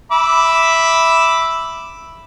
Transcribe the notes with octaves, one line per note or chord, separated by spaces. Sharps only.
E5 B5 D6